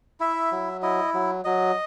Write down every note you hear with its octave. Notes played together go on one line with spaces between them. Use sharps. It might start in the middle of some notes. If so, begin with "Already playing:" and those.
E4 E5
F#3
E4 D#5
F#3
F#3 D#5